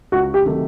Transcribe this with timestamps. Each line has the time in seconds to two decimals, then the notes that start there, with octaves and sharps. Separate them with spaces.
0.12 C#2 F#4
0.34 G4
0.45 C3 D#3 F#3 A3